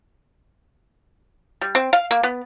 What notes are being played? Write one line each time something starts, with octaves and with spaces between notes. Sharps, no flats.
G3
C4
F5
A#3
B3